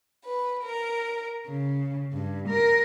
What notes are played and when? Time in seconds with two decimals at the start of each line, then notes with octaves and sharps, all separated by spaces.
0.24 B4
0.63 A#4
1.46 C#3
2.11 G2
2.46 A#4